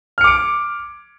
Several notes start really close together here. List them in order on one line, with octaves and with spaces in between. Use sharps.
F6 C#7 D6 D7